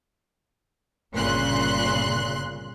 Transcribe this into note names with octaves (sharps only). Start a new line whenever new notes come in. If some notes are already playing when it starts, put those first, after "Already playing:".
G1 A#2 C#3 C6 F#6